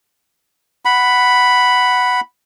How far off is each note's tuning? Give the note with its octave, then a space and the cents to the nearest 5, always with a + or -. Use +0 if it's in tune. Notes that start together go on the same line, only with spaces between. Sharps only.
F#5 +0 B5 +0